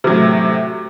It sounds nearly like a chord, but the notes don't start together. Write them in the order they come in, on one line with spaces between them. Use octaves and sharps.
C3 F#3 A2